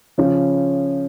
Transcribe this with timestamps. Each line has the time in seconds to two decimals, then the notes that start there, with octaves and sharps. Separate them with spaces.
0.18 C#3 F3 C#4